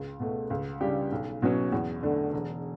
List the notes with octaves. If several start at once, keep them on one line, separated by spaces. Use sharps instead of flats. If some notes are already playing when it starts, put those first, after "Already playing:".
Already playing: C#2
B2 A3
C#2
C#3 G3 D4 G4
B1
B2 F#3 C#4
E2
D3 A3 D4
E1